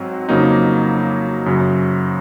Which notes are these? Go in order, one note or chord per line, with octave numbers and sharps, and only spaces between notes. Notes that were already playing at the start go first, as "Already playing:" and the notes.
Already playing: G#2 F#3 C4
F2 C#3 F#3 A#3 D#4
F#2 C#3 F#3